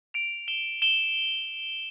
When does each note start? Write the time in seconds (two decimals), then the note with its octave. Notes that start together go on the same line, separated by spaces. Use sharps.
0.14 D7 F7
0.48 E7 G7
0.82 E7 G7